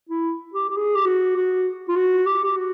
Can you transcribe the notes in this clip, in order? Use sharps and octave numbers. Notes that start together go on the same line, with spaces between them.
E4
G4
G4
G#4
G4
F#4
F#4
F4
F#4
G4
G4
F#4